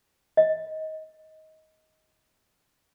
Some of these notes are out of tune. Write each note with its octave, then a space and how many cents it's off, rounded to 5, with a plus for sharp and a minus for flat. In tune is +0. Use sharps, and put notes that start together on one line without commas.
D#5 +20